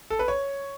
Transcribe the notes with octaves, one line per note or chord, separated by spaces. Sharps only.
A4
B4
C#5